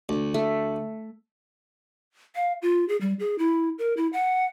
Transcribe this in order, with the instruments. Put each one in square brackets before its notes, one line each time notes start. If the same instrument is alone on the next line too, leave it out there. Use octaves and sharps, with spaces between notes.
[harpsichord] D2
[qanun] A3
[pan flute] F5
F4
G#4
G3
G#4
E4
A#4
E4
F#5